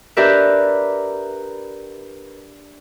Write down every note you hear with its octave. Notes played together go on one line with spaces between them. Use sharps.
D4 G4 A#4 B4 D5 E5